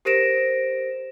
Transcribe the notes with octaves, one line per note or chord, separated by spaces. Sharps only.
G4 A#4 C5 A#6 D7 E7